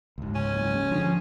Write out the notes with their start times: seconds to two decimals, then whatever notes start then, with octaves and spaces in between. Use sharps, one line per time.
0.18 C#2 G#2
0.35 C#4
0.53 F#1
0.73 C#3
0.91 D3 F3